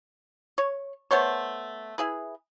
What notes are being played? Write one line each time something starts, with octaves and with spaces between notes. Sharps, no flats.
C#5
A3 B3 C5 C#5
E4 G#4 B4